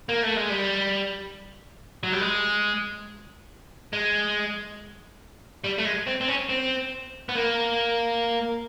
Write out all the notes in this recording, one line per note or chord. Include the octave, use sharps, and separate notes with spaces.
A#3
A3
G#3
G3
F#3
G3
G#3
G#3
G3
A3
G#3
C4
C4
C#4
C4
B3
A#3